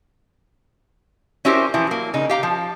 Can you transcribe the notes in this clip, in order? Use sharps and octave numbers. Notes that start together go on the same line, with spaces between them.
C#4 E4 F#4 G4 A#4 C5
E3 F3 E4
F#3 A#3
C#3 D#4
G4 F5 A#5
F3